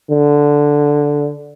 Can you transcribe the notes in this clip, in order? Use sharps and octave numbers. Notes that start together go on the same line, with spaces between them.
D3